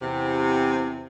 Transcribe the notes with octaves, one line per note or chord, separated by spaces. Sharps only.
E2 C3